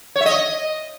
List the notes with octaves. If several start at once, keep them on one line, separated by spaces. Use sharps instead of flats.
C#5
E5
D#5